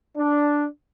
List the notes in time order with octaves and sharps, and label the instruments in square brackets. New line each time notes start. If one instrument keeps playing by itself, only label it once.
[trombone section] D4